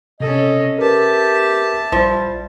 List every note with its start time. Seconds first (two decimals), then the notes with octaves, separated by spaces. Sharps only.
0.20 C3 C#4 A4 D#5
0.79 G4 A#4 B4 E5 A5
1.92 A#1 F3 G3 A6